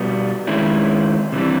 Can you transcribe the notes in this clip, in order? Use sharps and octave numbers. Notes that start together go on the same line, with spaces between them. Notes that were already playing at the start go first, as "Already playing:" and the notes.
Already playing: B2 G3 B3
D#3 G#3 C#4 E4
C3 E3 G3